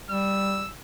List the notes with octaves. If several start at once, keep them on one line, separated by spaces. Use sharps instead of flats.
G3 E6